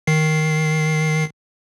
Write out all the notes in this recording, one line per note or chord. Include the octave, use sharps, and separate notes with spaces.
D#3 C7